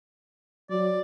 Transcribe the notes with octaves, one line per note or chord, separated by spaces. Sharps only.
F#3 D5